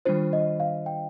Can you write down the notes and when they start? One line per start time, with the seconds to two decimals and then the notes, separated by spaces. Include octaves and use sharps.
0.05 D#3 G3 D4 F4 C5
0.33 D#5
0.60 F5
0.86 G5